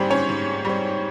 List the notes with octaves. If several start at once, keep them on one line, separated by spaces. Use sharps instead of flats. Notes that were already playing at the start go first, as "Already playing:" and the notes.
Already playing: G#2 G3 C4 G4 G#4
C#4 C#5
G#2
G3 C4